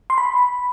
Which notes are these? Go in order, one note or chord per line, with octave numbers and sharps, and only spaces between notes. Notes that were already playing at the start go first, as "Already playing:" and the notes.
C6
B5